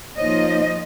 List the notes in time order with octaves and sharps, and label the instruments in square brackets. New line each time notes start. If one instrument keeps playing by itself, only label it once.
[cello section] F3 A#3 D#5 [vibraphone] D#4 C5 C#5